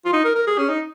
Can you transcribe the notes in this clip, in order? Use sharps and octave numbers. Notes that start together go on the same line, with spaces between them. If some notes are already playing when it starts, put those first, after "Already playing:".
F4
D#4
A#4
A#4
G#4
C#4
D#4